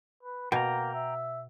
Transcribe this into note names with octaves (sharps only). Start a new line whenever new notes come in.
B4
B2 A#3 G5 A#5
E5